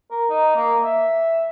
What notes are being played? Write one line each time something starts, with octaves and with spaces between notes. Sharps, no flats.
A#4
D#4
A#3
E5